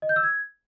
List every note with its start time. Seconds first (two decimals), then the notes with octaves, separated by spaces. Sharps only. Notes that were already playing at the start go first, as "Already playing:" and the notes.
0.02 D#5
0.09 G6
0.16 E6
0.23 G#6